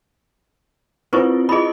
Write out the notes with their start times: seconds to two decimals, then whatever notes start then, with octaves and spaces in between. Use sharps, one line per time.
1.13 C4 E4 F4 B4 C5 C#6
1.49 E4 F4 G#4 D#5 B5